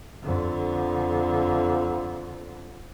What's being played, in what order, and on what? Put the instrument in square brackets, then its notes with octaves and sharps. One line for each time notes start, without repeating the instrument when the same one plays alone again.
[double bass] F2 D3